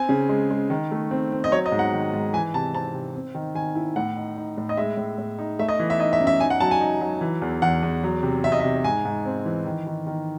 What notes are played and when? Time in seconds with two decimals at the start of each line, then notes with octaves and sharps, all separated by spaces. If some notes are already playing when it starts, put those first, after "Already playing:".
Already playing: C4 G#5
0.09 C#3
0.29 G#3
0.51 G#3
0.70 D#3
0.91 A3
1.11 C4
1.32 C4
1.44 D#5
1.52 F#3 C#5
1.66 D#5
1.72 G#2
1.79 F#5
1.93 D#3
2.13 G#2
2.33 E3 G#5
2.54 C3 A5
2.74 C4 A5
2.94 C3
3.15 C4
3.35 D#3
3.55 D#3 G#5
3.75 E4
3.96 A2 F#5
4.16 D#4
4.37 D#4
4.58 A2
4.69 D#5
4.77 G#3 E5
4.97 A2
5.18 A2
5.39 D#4
5.59 A3 E5
5.69 D#5
5.79 E3
5.90 E5
6.00 D#4 D#5
6.13 E5
6.20 F#2
6.27 E5
6.40 D#4 G#5
6.50 F#5
6.60 F#3 A5
6.71 G#5
6.81 D#4
7.01 F#3
7.21 E3
7.42 E2
7.62 E2 F#5
7.83 E2
8.04 F#3
8.23 C3
8.44 C3 E5
8.52 D#5
8.60 E5
8.64 C3
8.84 G#2 G#5
9.05 G#2
9.25 C4
9.45 E3
9.65 D#3
9.87 D#3
10.07 D#3